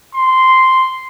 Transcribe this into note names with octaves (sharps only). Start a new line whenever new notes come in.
C6